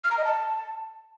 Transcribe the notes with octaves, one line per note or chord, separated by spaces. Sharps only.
F6
A#5
D#5
A5